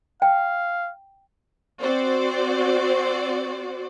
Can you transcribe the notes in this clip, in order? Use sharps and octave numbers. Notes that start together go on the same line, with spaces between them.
F5 G5
C4 F#4 C5 D5